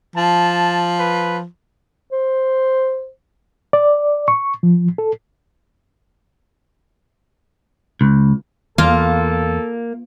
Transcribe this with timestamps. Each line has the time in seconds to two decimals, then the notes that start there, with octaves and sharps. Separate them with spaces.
0.16 F3 A5
0.99 B4
2.12 C5
3.73 D5
4.28 C#6
4.63 F3
4.98 A4
8.01 C#2
8.78 E2 A#3 F4 A4